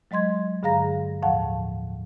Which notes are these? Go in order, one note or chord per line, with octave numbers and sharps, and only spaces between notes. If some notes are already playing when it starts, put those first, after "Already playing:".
F#3 G#3 D#5 C6 G#6
G2 D3 G#4 F5 A#5 A#6
D#2 A2 F3 F5 F#5 A5